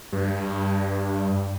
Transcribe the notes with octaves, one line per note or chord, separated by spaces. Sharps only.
G2